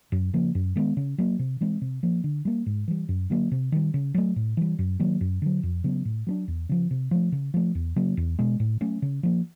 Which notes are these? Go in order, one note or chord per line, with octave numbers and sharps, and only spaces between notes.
F#2
C#3 F3 A#3
F#2
D#3 G#3 B3
C#3
F#3 A#3
C3
E3 G#3 C4
C3
F3 A#3
D3
G3 A#3
G#2
E3 G3
F#2
D3 F#3 A#3
C3
D#3 G3
C#3
F#3 A3
A2
E3 G3
F#2
D#3 F#3 A#3
F#2
D3 F#3
F2
C#3 F#3 B3
A2
F#3 B3 D4
E2
C#3 F3
C3
F3 A3
C#3
F3 A3
E2
C#3 F#3 A#3
E2
B2 G#3
A2
F#3 A3 C#4
C#3
F3 A#3